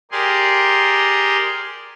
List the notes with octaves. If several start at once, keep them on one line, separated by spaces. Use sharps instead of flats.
G4 G#4 A#4 D5 C6